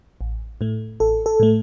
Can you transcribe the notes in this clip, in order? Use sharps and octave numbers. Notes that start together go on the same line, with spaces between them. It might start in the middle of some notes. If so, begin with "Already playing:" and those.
A1
A2 A3
A1 A4
A4
A2 A3